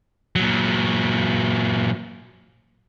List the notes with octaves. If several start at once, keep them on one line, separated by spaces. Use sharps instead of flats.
A#2 F#3